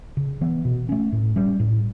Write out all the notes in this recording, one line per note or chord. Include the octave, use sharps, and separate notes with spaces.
C#3
E3 B3
B2
A3 C#4
A2
G3 C#4
A2